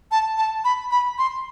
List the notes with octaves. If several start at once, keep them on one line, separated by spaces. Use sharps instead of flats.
A5
A5
B5
B5
C6